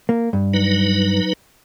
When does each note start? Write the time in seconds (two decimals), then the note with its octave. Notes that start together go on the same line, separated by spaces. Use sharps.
0.09 A#3
0.33 G2
0.54 F#3 D#4 B4